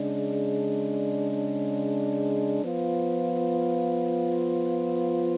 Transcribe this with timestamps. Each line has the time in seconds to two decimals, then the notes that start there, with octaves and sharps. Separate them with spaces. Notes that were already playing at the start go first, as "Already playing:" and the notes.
Already playing: C#3 G#3 D4
2.63 F3 B3 F4